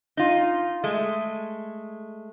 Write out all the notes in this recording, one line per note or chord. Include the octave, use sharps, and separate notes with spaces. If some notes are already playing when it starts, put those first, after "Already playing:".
D#4 F4
G#3 A3